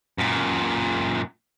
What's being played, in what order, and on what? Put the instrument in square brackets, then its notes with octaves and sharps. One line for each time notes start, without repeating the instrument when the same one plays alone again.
[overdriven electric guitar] F#2 A#2